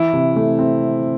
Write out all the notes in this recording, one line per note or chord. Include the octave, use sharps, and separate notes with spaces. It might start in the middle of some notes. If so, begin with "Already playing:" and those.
Already playing: E3 E4
C3
A3
C4